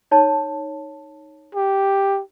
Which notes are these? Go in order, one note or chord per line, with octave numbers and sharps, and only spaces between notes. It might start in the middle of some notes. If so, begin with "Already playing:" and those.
D#4 C#5 A5
G4